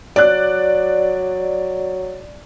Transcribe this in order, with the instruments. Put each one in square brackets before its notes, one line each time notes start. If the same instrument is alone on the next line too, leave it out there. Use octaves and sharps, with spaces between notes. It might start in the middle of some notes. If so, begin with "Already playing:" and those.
[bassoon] F#3 [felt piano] D5 F#6